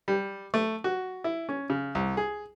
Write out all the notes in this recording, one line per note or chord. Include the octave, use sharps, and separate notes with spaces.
G3
A3
F#4
E4
C#4
C#3
C2
G#4